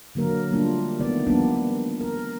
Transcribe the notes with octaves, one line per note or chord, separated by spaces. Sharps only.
D3 F#3 A#3 A#4
G3 A3 A#3 D4 F4
D#3 A3 B3 D5
F3 G3 A#3 B3 D4
A#4